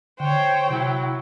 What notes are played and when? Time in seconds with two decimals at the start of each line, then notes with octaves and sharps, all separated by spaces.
0.20 D3 C5 C#5 G5
0.70 C3 F#3 E4